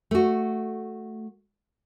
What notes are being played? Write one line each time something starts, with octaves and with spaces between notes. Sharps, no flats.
A3 F#4